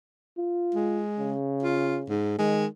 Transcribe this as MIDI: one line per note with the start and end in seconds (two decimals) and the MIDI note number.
0.38 1.03 65
0.74 1.33 56
1.19 2.17 49
1.62 1.98 65
2.09 2.37 44
2.38 2.66 51
2.38 2.66 56